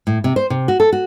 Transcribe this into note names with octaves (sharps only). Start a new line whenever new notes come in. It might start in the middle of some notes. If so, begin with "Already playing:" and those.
A2
C3
C5
C3
F#4
A4
F#4